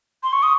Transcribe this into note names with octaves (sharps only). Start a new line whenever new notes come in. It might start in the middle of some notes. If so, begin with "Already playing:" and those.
C6
C#6
D#6